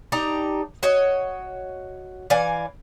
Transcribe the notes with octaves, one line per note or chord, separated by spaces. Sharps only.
D4 D#4 G4 A#5
F#4 C#5 D#5
E3 D5 F5 G#5